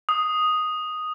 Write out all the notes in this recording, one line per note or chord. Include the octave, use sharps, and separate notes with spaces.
D#6